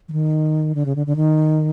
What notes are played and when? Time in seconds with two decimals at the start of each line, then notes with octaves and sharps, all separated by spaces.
0.09 E3
0.12 D#3
0.75 D3
0.86 C#3
0.96 D3
1.06 D3
1.16 D#3